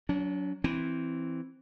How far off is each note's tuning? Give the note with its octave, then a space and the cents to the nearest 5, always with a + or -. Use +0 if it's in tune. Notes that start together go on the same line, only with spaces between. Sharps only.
F#3 +0 D4 -40
E3 +0 C4 +5